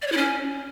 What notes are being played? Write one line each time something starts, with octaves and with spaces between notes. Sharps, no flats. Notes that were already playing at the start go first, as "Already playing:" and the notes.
D5
C#5
E4
C#4